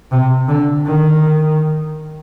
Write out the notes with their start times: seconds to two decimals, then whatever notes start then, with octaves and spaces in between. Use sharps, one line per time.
0.11 C3
0.48 D3
0.86 D#3